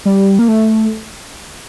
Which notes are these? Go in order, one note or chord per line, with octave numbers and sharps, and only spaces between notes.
G3
A#3
A3